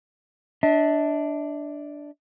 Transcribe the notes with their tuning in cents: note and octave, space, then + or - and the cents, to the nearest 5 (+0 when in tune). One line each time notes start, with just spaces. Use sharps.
D4 +0 E5 -45